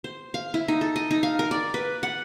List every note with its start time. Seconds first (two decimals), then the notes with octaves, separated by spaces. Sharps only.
0.04 C5
0.34 F5
0.54 E4
0.68 D#4
0.81 A4
0.96 D#5
1.11 D#4
1.23 F5
1.39 A#4
1.51 D5
1.74 B4
2.03 F#5